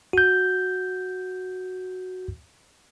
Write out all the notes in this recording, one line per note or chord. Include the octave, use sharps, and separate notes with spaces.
F#4 G6